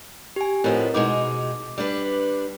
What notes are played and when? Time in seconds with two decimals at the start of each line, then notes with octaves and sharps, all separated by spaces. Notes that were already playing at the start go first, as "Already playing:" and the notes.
0.36 G4 G#5
0.64 A2 F3 B3 C4 A#4 D#5
0.94 B2 G#3 D#4 D6
1.78 G3 D4 B4